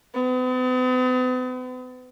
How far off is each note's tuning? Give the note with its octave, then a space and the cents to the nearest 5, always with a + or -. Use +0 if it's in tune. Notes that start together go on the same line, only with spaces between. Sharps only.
B3 +45